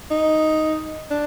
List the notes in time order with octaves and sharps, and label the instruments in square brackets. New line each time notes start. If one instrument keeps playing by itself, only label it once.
[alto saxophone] D#4
D4